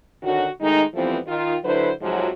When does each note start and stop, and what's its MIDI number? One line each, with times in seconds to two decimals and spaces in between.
0.23 0.47 50
0.23 0.47 51
0.23 0.47 61
0.23 0.47 66
0.61 0.83 51
0.61 0.83 56
0.61 0.83 57
0.61 0.83 63
0.95 1.18 52
0.95 1.18 53
0.95 1.18 55
0.95 1.18 57
0.95 1.18 59
0.95 1.18 60
1.27 1.55 51
1.27 1.55 65
1.64 1.91 50
1.64 1.91 54
1.64 1.91 64
1.64 1.91 71
1.64 1.91 72
2.02 2.29 41
2.02 2.29 44
2.02 2.29 48
2.02 2.29 53
2.02 2.29 54